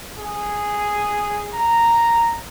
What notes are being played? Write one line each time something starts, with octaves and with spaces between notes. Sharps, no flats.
G#4
A#5